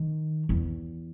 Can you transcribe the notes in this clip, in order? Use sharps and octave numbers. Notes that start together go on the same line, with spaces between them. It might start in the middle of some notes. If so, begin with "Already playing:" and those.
Already playing: D#3
E2